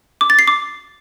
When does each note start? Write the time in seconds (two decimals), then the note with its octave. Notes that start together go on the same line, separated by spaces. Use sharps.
0.21 D6
0.30 A6
0.39 C7
0.48 D6